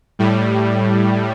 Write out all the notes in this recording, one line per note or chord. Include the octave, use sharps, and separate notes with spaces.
A2 G3